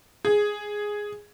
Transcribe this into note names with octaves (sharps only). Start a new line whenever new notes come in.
G#4